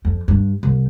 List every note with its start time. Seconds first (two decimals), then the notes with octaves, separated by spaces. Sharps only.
0.05 F2
0.28 G2
0.63 C2